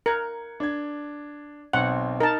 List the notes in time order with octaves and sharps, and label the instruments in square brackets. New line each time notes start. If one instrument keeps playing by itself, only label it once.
[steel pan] A#4 [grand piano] F#6 G#6 C#7
[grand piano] D4 G#6
[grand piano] B1 C4 C6 [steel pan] F#5
[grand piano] D#4 [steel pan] A#4 A5